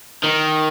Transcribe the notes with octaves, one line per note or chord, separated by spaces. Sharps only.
D#3